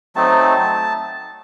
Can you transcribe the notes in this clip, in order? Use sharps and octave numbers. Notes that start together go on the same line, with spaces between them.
F#3 A3 C4 D#4 A5